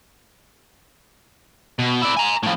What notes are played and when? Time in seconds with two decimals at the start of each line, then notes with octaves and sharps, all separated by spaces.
1.79 B2
2.01 E4 D5
2.17 G#5 A#5
2.43 A2 F3